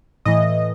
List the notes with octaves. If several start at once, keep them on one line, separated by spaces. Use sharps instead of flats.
A2 E3 D#5